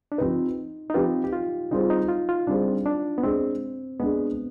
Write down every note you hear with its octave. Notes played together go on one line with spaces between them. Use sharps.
D4
F3 C4 D#4 G4 B4
D#4
F3 C4 F4 G4 B4
G4
F4
G3 C4 D#4 F4 G#4 C5
D#4
F4
F4
G3 C4 D4 F4 G#4 C5
D4
B3
G#3 C4 D4 G#4
G#3 B3 D4 G#4